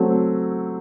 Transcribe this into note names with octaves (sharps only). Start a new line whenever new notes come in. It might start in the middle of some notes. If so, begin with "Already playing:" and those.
Already playing: F#3 A3 C4